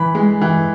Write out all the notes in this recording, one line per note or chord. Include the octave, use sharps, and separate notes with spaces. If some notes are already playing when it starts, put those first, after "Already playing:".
Already playing: E3 B5
G#3
E3